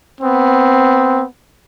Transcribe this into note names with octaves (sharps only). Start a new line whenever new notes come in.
B3 C4